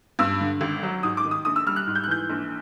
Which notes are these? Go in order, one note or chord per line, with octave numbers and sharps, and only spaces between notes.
G2 E6
D3
G#1
F#3
G#2 D#6
D6
D#3
D#6
A#1 D#6
E6
G3 F6
F#6
G#2
G6
F#6
E3 G6
A#1